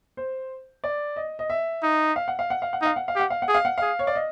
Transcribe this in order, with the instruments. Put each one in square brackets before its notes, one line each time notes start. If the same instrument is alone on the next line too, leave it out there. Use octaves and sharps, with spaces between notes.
[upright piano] C5
D5
D#5
D#5
E5
[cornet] D#4
[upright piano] F5
F#5
F5
F#5
F5
F#5
[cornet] D#4 [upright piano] F5
[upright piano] F#5
F5
[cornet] G4 [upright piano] F#5
[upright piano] F5
F#5
[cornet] G#4
[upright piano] F5
F#5
[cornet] G#4 [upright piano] F5
[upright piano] C#5
D5
D#5